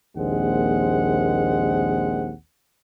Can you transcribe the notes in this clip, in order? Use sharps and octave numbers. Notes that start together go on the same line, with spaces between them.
A#1 D#2 G#3 C4 F#5